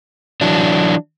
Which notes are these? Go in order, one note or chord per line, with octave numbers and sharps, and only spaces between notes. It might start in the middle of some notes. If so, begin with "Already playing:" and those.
E3 F#3 D4